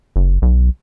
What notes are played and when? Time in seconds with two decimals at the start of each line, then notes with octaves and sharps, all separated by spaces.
0.16 F#1
0.42 B1